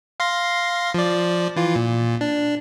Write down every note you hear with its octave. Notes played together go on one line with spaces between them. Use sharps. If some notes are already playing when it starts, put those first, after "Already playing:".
F5 C6 A#6
F3 D5
E3 F4
A#2
D4